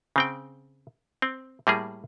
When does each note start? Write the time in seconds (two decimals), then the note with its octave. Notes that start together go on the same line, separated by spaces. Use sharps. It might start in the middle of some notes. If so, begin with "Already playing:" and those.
0.16 C#3 C4 G5
1.22 C4
1.67 A2 G3 A#3 G#4